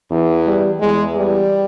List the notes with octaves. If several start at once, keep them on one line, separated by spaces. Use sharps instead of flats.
E2 E3
G3
E2 E3 G#3
G3